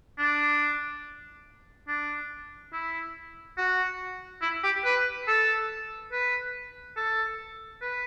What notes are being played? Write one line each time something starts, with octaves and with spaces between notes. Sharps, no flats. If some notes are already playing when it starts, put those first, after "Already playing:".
D4
D4
E4
F#4
E4
G4
B4
A4
B4
A4
B4